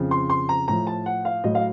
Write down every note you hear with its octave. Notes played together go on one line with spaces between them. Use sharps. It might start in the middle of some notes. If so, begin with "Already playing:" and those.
Already playing: F2 C#3 F3
C6
C6
A#5
A2 F3 A#5
A5
F#5
F5
A2 F#3 D#5
F5